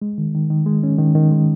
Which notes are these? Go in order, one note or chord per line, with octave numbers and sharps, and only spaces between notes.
G#3
D#3
D#3
D#3
G#3
C#4
D#3
D#3
G#3